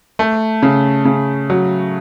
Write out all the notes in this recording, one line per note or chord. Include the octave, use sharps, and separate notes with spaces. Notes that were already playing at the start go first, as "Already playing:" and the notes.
A3
C#3
C#3
F#3